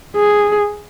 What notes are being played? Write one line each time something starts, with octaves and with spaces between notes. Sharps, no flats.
G#4